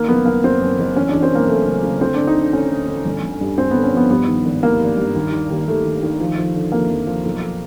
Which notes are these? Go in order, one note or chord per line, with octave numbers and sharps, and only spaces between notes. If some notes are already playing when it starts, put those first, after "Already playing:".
Already playing: D#3 A#3
F#1 B3
F#1 A#3
F#2 C4
F#2
F#1
E2 C#4
E2 D4
C4
E1 A#3
E1 A3
C#3 A3
C#3
D2 C4
D2 D4
D#4
D2 D4
D2 C#4
D2
D2
G1
G1
G2
G2 C4
D3 B3
C#4
F3 B3
G2 B3
D#3
G#1
D#3 A#3
G#1
G2
D#2
D#3
D#2
D#3 A3
D#3
D#3
F3
F3
D3
F2 A#3
F2
F3
B1